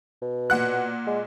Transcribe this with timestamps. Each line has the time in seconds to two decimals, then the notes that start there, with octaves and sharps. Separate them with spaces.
0.22 B2
0.50 A#2 F#5 F#6
1.07 G#3